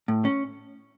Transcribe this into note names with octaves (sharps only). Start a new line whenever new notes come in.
A2
C#4